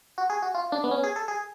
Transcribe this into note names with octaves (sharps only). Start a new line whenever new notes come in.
F#4
G#4
F#4
F4
D4
B3
C#4
G#4
A4
G#4